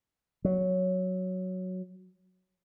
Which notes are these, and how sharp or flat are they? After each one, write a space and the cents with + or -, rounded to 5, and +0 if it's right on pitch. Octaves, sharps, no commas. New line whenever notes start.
F#3 +0